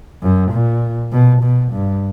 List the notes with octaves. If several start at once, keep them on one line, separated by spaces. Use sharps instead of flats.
F#2
A#2
B2
B2
G2